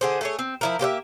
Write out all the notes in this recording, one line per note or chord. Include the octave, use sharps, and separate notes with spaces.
D3 G#4 C5
A3 G#4 C#5
C4
F3 E4 A#4
A#3 G4 C5 E5